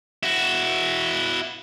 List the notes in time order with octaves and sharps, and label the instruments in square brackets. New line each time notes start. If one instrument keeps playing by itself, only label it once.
[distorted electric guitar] E4 F#4